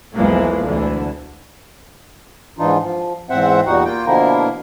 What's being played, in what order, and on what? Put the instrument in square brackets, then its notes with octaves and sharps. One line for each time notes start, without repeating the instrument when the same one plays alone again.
[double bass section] B1 E2 E3 F3 G#3 A#3
D2 D3 E3
[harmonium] G#2 E3 D4 D#4 F4
F3
E2 G#2 C4 C5 E5 F#5
E2 A#2 G3 D#4 F#4 F#5
A#3 F4 G5
B2 D3 F3 A#3 E4 A#4